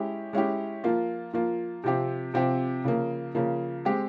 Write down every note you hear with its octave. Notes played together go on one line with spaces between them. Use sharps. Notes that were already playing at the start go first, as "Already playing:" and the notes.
Already playing: G#3 C#4 E4 G4
G#3 C#4 E4 G4
F3 A#3 F4
F3 A#3 F4
C3 F3 C4 G4
C3 F3 C4 G4
C#3 F3 A#3
C#3 F3 A#3
G#3 C4 G4